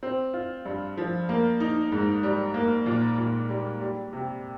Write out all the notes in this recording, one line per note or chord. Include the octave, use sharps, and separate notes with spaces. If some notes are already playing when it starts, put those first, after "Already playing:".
C4
F4
G2
F3
A#3
D#4
G#2
G3
A#3
A#2
A#2
G3
G3
C3